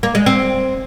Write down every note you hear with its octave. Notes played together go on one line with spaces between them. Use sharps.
A#3
G#3
C4